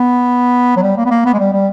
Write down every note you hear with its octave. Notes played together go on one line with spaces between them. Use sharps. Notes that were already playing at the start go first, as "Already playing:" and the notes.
Already playing: B3
F#3
G3
A#3
B3
A#3
B3
G#3
G3
G3